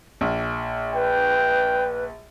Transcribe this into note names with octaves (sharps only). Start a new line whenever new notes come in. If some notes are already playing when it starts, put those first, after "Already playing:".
A#1
B4 G5